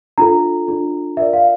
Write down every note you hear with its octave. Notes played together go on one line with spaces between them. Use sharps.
D4 F4 A4 A#5
D4 F4 A4
F4 A#4 D5 E5
F5